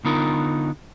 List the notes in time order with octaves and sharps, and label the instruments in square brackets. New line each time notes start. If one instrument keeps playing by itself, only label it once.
[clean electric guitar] D3 B3 D#4 F4 A#4